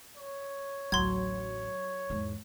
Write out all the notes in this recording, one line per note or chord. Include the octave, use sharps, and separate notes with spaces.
C#5
A1 D2 F#3 C6 G#6
E2 G#2